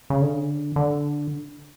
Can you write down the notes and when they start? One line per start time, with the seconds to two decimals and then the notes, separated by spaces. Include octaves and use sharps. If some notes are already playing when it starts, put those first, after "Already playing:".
0.10 C#3
0.22 D3
0.76 D3